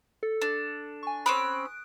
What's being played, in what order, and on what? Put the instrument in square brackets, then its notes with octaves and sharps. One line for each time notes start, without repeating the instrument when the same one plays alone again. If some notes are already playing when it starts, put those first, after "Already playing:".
[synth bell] A4
[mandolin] D4
[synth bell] G#5 C#6
[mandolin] C4 C#4 B5 [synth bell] D#6 F#6 D7